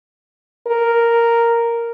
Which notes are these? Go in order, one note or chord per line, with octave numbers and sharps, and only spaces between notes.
A#4